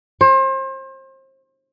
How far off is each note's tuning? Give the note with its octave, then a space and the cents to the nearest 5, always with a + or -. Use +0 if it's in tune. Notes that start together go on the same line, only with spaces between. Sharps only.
C5 +35